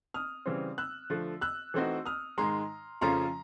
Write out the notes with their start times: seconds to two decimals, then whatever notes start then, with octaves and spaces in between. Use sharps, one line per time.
0.14 D#6 F6
0.46 C#3 E3 G3 C4
0.78 E6 F#6
1.10 D3 F3 A3
1.41 E6 F#6
1.74 E3 A3 C4 D#4 F#4
2.06 D#6 F6
2.38 G#2 D#3 G#3 A#5 C6
3.01 F2 C#3 F3 A3 C#4 A#5 C6